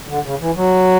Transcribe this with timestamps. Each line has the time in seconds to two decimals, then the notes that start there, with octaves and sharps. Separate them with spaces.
0.09 D3
0.24 C#3
0.40 E3
0.56 F#3